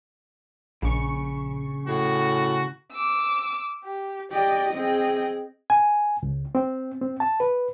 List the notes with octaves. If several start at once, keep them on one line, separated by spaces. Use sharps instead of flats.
A#1 C#3 C#6
A2 F#4
D6 E6
G4
G4 D5 D#5
C4 G#4 D#5 G5
G#5
C#2
C4
C4
A5
B4